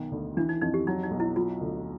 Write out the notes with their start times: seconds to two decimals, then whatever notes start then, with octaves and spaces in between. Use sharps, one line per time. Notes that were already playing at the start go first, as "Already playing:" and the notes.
Already playing: B1 D#3
0.11 D2
0.37 E3 D4
0.49 D#4
0.61 F2 D#4
0.74 G4
0.87 F#3 D#4
1.03 D#4
1.11 B1
1.20 E4
1.36 F#3 F4
1.61 D2